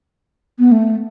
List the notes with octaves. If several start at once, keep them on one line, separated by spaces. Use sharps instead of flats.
B3
A3